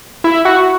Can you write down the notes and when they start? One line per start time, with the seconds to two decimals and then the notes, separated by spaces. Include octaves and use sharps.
0.24 E4
0.45 F#4